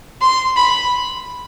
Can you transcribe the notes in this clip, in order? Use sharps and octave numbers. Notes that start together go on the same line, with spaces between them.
C6
B5